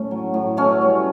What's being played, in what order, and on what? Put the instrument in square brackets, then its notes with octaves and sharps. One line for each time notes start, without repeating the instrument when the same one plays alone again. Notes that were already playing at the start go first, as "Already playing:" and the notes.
Already playing: [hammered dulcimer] A2 A3 C#4
F#3
A2
B2 A3 C#4
G3